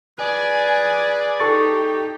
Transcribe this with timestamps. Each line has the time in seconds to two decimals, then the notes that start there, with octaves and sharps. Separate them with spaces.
0.19 G#4 B4 D5 G#5
1.40 D#4 G4 A4 C#6 A6